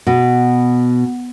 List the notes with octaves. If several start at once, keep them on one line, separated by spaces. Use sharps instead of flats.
B2